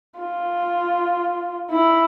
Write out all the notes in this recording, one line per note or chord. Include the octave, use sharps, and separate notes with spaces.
F4
E4